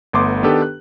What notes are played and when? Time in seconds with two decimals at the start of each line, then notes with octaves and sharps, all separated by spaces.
0.13 G1 A3 B3 C6 D6
0.43 D#3 B3 D4 G4 A4 B4
0.62 F#6